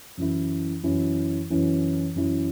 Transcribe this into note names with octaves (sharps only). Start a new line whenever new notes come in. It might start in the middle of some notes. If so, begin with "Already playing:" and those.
F#2 E3 C#4 E4
F#2 E3 C#4 E4
F#2 E3 C#4 E4
F#2 E3 C#4 E4